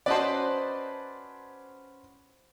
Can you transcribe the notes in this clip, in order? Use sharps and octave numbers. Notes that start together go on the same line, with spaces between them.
C#4 F#4 B4 C5 D5 D#5 A5